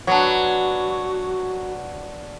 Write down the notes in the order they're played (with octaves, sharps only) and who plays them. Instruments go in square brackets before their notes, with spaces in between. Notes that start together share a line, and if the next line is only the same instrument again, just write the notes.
[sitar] F#3 [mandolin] B3 D4 [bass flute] F#4